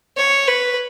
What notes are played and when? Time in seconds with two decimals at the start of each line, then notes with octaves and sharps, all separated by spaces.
0.17 C#5
0.48 B4